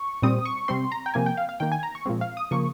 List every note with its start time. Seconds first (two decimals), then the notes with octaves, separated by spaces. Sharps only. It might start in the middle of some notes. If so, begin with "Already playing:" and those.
Already playing: C#6
0.22 A#2 G3 C4 D#6
0.45 C#6
0.68 C3 G3 C4 C6
0.92 A#5
1.06 G5
1.14 C3 F3 A#3 G#5
1.26 G5
1.37 F5
1.49 F5
1.60 D#3 A#3 G5
1.72 G#5
1.83 A#5
1.95 C#6
2.06 A#2 F3 G#3 C4
2.21 F5
2.37 D#6
2.51 C#3 F3 A#3 C#6